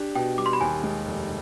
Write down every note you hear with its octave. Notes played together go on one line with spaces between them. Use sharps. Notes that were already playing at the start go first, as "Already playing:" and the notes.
Already playing: D4 G4
B2 G5
G3 D6
C6
B5
D#2 G#5
G#3
F1